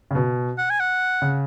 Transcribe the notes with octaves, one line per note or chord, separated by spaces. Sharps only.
C#3
B2
F#5
G#5
F#5
C#3